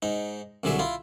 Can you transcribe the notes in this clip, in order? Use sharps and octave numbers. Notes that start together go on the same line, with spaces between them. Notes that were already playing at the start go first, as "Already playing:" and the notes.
G#2 D#4
C2 D3 F#3 G#4 E5
E4 F4